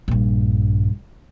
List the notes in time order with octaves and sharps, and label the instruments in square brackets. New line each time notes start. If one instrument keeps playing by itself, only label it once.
[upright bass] A#1 G2